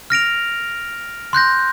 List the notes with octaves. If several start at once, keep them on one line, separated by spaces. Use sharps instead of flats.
F6 A#6 D7 F7
C6 F#6 G6 A#6